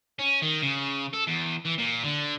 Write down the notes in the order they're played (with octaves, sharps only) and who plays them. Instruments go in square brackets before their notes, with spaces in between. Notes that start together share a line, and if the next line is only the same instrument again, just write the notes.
[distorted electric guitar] C#4
D#3
C#3
A4
E2
E3
A#2
D3